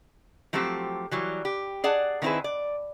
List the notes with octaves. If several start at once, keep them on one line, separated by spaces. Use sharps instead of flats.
F3 F#3 A3 C4 G4
E3 F#3 G3
G4
G#4 D5 F#5 A5
D#3 B3 C4 E4 G#4 B4
D5